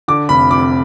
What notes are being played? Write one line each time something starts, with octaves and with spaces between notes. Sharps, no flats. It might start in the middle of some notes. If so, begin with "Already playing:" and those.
D3 D6
F1 B5
F2 D6